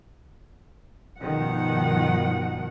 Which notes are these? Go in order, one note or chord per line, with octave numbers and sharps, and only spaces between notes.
G2 B2 D#3 F3 F#5